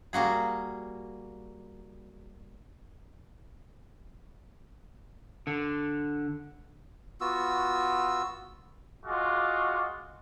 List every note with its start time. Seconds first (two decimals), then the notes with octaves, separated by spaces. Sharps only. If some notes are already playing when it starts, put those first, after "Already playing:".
0.13 G3 A#3 F#4 G#4
5.47 D3
7.21 B3 F4 F#4 E6
9.05 G#3 F4 F#4 D6